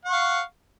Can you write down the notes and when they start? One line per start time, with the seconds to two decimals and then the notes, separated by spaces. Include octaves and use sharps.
0.05 F#5
0.09 C#6
0.12 F5